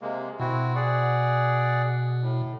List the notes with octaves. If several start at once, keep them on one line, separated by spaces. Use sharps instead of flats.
C3 G#3 A#3
B2 C4 E4 F#4
G#4 D5 F#5
A2